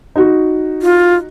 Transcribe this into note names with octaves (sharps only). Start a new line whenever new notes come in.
D#4 F#4
F4